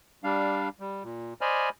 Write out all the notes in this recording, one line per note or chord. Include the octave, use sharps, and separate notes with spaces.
G3 D4 F5
G3
A#2
C5 D5 D#5 G#5 B5 F6